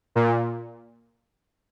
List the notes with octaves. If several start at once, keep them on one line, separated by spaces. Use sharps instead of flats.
A#2